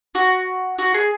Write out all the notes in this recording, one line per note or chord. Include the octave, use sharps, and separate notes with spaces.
F#4
F#4
G#4